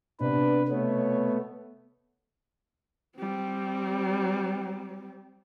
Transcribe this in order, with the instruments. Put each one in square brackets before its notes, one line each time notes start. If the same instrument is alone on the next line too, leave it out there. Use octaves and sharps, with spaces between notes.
[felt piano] C3 [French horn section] B3 D4 [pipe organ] B4
[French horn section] B2 C#5 [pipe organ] A3 B3
[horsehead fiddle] G3 C4